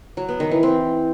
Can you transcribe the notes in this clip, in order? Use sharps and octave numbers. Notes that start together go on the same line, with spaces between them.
F#3
B3
D#3
E3
C4